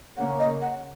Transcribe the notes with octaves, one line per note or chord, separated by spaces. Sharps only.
C#3 A#3 C#4 F#5
D#5
F#5